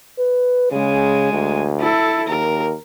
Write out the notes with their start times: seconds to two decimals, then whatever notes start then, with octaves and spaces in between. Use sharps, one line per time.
0.18 B4
0.72 C#3 G#3 G#5
1.32 D2
1.80 E4 A4
2.28 D#2 A#4